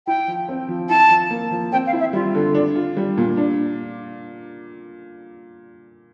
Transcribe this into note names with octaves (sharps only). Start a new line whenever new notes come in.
E4 G5
F3
C4
F3
E4 A5
F3
A#3
F3
C4 G5
F5
E4
E5
G3 F4
D3
D4
F4
G3
A#2
D4